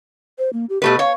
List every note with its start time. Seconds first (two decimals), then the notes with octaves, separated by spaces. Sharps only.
0.39 C5
0.53 A#3
0.70 G4
0.82 B2 A3 G4 B4
0.99 C#5 F5